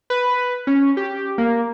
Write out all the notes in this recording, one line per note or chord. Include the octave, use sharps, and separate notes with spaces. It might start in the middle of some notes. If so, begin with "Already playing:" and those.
B4
C#4
G4
A#3